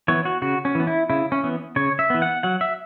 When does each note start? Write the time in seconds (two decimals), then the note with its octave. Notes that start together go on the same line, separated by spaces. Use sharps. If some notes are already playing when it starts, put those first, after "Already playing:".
0.08 E3 B3 C#5
0.25 F#4
0.42 C#3 F#4
0.65 C#4
0.75 E3 B3
0.87 E4
1.10 C#3 E4
1.32 C#4
1.43 E3 B3
1.76 C#3 C#5
1.99 E5
2.10 E3 B3
2.22 F#5
2.43 F#3 F#5
2.61 E5